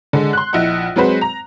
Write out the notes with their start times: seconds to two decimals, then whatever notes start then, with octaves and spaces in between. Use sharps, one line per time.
0.13 D3 G#3
0.33 C6 F#6
0.53 A#1 E4 D#5 F#5
0.96 F#3 G#3 C4 F#4 B4 C5
1.21 A#5